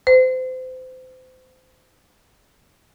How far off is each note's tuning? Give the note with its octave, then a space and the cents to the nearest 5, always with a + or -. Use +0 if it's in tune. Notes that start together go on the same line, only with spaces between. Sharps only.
C5 -30